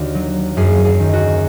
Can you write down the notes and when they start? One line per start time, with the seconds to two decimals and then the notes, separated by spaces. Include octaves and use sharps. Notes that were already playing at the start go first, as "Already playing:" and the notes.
Already playing: D#2 D3 F#4
0.15 F#3
0.57 F#2 G#4
0.85 G#4
1.00 D#3
1.13 F#4